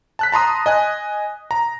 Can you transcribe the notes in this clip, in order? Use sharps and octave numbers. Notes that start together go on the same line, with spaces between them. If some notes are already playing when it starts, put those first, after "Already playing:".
A5 F#6 B6
A5 A#5 C6 D#6
D#5 G#5 F#6
A#5